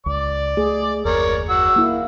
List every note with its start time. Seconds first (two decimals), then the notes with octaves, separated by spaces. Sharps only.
0.06 C#2 D5 D6
0.57 A3 G#4
1.05 F#1 D#2 A#4 C#5 D5
1.49 F#4 E6
1.76 A#3 E4